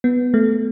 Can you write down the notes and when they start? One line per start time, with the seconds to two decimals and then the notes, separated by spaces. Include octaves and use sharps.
0.04 B3
0.34 A3